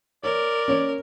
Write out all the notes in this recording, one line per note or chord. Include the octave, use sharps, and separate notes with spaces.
A#4 C#5 D5
C#4 C#5